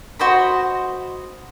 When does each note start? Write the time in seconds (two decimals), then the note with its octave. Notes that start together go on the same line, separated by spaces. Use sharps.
0.19 F#4 C5 D#5 B5